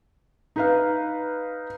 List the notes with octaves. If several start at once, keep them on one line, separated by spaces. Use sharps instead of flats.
D#4 B4 F5